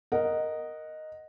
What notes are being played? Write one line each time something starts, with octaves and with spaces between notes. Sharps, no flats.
A#4 D#5 F#5